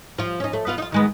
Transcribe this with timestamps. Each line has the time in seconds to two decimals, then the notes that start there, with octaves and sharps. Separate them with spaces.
0.18 F3 F4
0.40 C#4 D#4
0.53 A3
0.67 B3 F4 F5
0.78 D#4 F4
0.92 D#3 G#3 B3